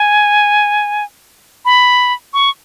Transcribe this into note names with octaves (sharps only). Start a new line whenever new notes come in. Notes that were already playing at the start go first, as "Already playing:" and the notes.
Already playing: G#5
B5
C#6